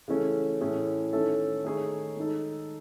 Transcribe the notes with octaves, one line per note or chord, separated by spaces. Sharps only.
C#3 E3 A3 C#4
A2 E3 A3 C#4 G#4
D#3 A3 C#4 E4 A4
D#3 A3 D#4 G#4 C#5
D#3 G#3 D#4 A4